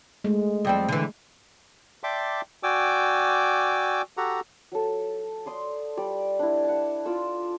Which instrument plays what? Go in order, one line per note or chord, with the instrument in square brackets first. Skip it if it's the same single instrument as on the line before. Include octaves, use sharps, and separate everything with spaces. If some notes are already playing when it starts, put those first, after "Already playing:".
[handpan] G#3 A3
[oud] F2 G3 C4
D3 E3
[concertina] D5 E5 G5 A5 C6 D6
F#4 D5 G5 G#5 D6 E6
F#4 G4 A4 F#5 A#5
[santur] F#3 A4
D5 C6 D#6
G3 D5
D4 E4
F#5 A5
F4 D5 E6